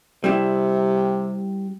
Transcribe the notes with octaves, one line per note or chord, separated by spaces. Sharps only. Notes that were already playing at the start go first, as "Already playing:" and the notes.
C3 G3 C4 E4